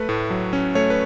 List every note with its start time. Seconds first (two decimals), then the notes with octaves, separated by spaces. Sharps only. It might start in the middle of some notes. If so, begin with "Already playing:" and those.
Already playing: A3 B4
0.09 A2
0.30 F#3
0.53 C#4
0.75 A3 C#5
0.90 B4